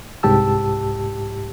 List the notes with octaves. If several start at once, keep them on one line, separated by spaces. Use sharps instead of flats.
C2 G#2 G4 A5 E6